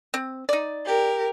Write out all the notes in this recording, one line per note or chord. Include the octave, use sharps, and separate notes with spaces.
C4
D#4 D5
G4 A#4